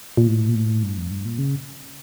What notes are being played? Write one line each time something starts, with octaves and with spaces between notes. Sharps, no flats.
A#2
A2
A#2
A2
G2
F2
G2
A#2
C#3